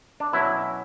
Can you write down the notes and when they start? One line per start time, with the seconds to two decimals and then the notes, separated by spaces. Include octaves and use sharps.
0.20 D4
0.33 B2 F#3 C#4 E4